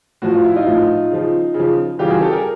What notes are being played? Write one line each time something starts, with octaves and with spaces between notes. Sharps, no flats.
A2 F3 F#4
F4
E4
D#4 F4
A2 F3
C#3 F3
C#3
F3
C#3 E3 G3 F4 G4
F#4 G#4
G4 A4
G#4 A#4